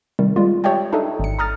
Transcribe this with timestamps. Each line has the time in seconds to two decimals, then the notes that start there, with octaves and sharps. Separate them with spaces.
0.19 C3 D#3 G3
0.36 G3 G#3 F4
0.64 G4 C#5 D5 E5 G5 A5
0.93 D4 D#4 A4 D#5 E5
1.19 G#1 C#7
1.39 A#5 D#6 F6 A6